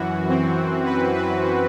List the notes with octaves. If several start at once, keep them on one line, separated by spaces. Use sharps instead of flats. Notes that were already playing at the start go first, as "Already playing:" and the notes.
Already playing: F#2 E3 F#4
C4
B4
B4